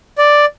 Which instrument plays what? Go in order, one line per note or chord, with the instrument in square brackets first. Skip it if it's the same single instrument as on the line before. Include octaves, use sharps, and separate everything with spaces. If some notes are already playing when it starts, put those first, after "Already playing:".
[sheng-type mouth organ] D5